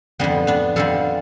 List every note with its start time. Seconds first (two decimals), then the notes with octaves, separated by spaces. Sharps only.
0.19 F2 D3 G3 B3
0.47 B3 D4
0.76 F2 D3 G3 F4 A4